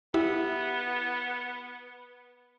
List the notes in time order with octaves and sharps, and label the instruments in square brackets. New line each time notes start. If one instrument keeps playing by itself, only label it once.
[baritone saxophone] B3 [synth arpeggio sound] E4 G4 E5